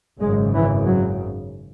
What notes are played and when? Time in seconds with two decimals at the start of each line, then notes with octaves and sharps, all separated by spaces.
0.21 G#1 F#2 C#3 G#3
0.53 E3
0.86 F#3